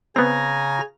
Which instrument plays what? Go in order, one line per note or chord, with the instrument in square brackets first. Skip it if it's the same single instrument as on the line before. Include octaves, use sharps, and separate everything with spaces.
[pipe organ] C#3 A#5 A#6 [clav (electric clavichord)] B3 C4 [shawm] G#5